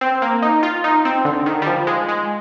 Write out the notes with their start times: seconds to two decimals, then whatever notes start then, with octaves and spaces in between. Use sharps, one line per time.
0.01 C4
0.22 A#3
0.42 D#4
0.63 F4
0.84 D#4
1.05 C4
1.25 D3
1.46 D#3
1.62 G3
1.66 F3
1.87 G#3
2.09 G#3